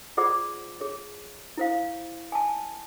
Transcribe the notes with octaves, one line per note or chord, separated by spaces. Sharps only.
F4 G#4 C5 D5 F#5 D6
G#4 C#5
E4 C5 F5
G#5 A5